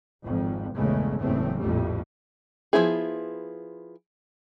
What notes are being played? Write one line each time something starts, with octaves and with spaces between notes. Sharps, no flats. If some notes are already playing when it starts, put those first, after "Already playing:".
G#1 F2 G#2
A#1 E2 G2 C#3 G#3 A3
F#1 E2 A2 C#3 A3 C4
A#1 F2 A2 G3 A3
F3 A3 B3 E4 G#4